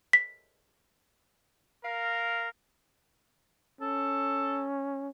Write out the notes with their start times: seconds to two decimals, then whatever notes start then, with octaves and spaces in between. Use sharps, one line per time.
0.13 B6
1.84 A#4 F5
3.81 C#4 A4